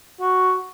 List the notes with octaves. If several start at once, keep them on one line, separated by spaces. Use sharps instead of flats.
F#4